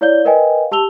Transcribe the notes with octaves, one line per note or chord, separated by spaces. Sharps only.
E4 C#5 D5 F5 G6 G7
A#4 B4 D#5 F5 G5 G#5
G4 A5 E6 F7 G7